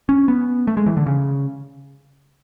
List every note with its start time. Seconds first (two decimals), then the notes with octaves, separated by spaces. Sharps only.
0.09 C#4
0.28 B3
0.67 A3
0.77 G#3
0.86 E3
0.97 D3
1.06 C#3